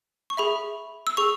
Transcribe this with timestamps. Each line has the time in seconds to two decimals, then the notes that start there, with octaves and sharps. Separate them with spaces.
0.30 C#6
0.37 G#4 E5 B5
1.07 E6
1.17 G#4 C#6